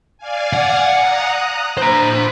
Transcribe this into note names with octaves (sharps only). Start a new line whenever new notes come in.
D5 F5 G#5
F#5
A#5 D#6 F#6
C5 A#5 B5